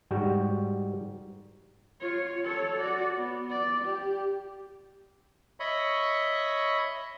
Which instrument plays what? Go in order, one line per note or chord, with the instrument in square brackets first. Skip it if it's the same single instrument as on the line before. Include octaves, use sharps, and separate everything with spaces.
[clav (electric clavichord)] G#2 G3 F#4 G4 G5
[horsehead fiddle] F4 C#5
A4 C#5
F#4 D5
B3
D5
G4
[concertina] C#5 D#5 E5 B5 C#6